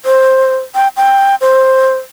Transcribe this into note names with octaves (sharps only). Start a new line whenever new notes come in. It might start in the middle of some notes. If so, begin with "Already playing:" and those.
C5
G5
G5
C5